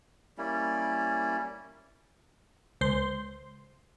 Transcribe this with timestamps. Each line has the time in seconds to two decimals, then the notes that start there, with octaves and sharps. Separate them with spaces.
0.38 G3 A#3 C#4 E4
2.81 C#2 C5 C6